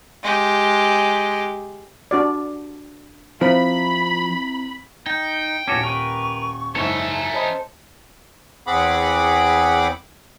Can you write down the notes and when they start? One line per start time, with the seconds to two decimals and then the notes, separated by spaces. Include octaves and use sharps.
0.23 G#3 G4
2.11 D4 F#4 D5
3.41 F3 C4 E4 A#5 B5
5.06 D#4 G5
5.68 D#1 C#4 F#4 G4 C#5 A5 D6 G#6
5.83 A#4 B4 C#6
6.75 F#1 G#2 C#4 A4 C5 E5
7.34 C5 C#5 D#5 A5 B5
8.67 E2 C4 G#4 F#5 B5 D6